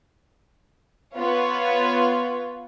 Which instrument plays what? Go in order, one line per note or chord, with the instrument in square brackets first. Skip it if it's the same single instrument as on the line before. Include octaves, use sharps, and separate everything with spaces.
[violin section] B3 F4 B4 C#5